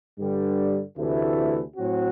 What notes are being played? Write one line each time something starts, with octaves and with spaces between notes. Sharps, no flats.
G2 D3 G3
D2 C3 E3 A3 E4
A2 F#3 C4 F#4